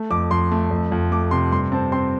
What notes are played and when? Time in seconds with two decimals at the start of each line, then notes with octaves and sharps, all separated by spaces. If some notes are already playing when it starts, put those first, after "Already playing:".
Already playing: A3
0.11 F2 D6
0.31 F2 C6
0.52 A3
0.71 F2
0.92 F2
1.11 A3 D6
1.31 C3 C6
1.51 G2 C6
1.72 C4 A5
1.92 C4 C6